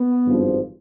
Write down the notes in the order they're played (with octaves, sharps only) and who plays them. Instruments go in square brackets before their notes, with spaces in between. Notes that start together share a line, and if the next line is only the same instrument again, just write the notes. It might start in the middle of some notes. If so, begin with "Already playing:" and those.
Already playing: [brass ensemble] B3
G#1 G2 F3